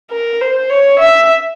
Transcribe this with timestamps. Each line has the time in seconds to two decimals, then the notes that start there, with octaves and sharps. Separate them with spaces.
0.11 A#4
0.40 C5
0.70 C#5
0.99 E5